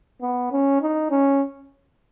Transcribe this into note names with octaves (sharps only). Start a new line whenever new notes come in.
B3
C#4
D#4
C#4